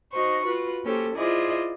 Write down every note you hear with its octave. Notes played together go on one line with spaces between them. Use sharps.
D#4 F#4 C5 C#6
F4 F#4 B4
A#3 C#4 G4 A4 C5
E4 F4 G#4 C5 D5 D#5